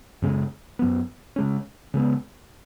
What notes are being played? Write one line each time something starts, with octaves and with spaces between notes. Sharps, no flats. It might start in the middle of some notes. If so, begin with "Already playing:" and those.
F#2 C#3 G#3 C#4
F#2 F#3 B3
C#3 G#3 C#4
C#3 G#3 B3